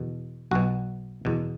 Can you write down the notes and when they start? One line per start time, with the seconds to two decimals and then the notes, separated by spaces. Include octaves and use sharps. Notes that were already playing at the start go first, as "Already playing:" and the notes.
Already playing: E2 B2
0.51 B1 B2 F#4
1.25 E2 B2